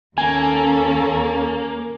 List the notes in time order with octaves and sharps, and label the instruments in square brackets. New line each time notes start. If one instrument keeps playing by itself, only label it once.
[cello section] D#2 C#4 A4 [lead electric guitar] A#3 [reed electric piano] G#5